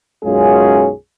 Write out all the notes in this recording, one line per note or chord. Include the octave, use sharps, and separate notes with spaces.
B1 F#2 G#3 C#4 F4 G#4